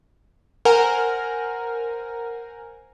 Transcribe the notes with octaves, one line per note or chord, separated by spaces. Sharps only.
A#4 C5 F#5 G#5 A#5 F6